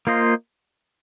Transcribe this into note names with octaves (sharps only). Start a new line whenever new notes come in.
A#3 F4 C5 D#5